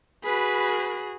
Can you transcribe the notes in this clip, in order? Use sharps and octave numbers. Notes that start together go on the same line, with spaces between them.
F#4 G#4 B4 B5